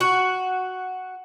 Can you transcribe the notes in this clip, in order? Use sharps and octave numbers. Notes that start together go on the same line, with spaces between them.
F#4